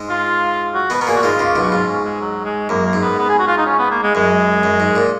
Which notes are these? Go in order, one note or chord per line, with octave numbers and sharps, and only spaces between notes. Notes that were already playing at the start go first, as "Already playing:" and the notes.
Already playing: G#2 G#3
F4
F#4
B2 B3 B4
B3 A#4
A#2 A#3 G#4
F#4
G#2 G#3 F4
C#2 C#3
B1 B2
F#4
G#2 F4
C#4
G#3
F#3
G#3
F#2 A#3
A#3
G#2
B3
B3
G#4
F#4
F4
D#4
C#4
B3
A#3
G#3
F#2 G#3
F#2
G#2
A#2